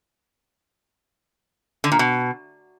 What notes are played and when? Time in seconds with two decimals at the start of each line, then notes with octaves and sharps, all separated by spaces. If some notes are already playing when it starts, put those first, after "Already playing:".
1.84 D3
1.92 A#2
1.99 B2